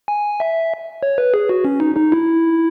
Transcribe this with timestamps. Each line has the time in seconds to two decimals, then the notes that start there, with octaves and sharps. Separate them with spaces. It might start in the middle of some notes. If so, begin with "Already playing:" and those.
0.08 G#5
0.40 E5
1.03 C#5
1.18 B4
1.34 G#4
1.49 F#4
1.65 C#4
1.80 D#4
1.97 D#4
2.12 E4